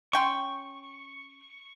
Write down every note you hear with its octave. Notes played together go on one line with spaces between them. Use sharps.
C#4 G5 C6 C#6